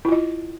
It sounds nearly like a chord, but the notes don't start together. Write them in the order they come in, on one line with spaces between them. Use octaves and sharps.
E4 F4 D#5